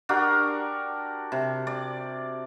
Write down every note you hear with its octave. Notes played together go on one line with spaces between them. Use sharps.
D4 F#4 G4 A#4
C3
D5